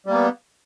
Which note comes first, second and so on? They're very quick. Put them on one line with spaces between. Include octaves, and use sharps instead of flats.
G3 A#3 B3